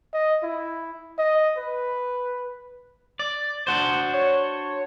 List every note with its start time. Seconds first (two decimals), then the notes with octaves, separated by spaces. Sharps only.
0.14 D#5
0.43 E4
1.19 D#5
1.58 B4
3.19 D5
3.67 D4 F#4 C5
4.14 C#5